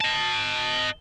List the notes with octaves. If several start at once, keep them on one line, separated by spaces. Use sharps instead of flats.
D#5 A5